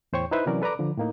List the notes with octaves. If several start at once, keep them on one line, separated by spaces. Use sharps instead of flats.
E2 A2 C5 C#5 G5 C#6
D#4 E4 B4 C5 E5
C3 E3 F#3 C#4 A#4 D5
A4 B4 D5 A#5 D6
D3 F3
A2 A#3 D#4